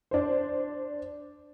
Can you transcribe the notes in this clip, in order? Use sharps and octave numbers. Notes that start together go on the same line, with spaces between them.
D4 C5